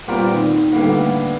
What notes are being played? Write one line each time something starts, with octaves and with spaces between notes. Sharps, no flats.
A#2 G3 B3 C4 F4 A#4
D#3
A2 D3 G3 A#3 B3